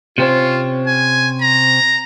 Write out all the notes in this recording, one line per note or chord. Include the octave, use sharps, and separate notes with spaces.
C3 C4 C#4 F4
G#5
A#5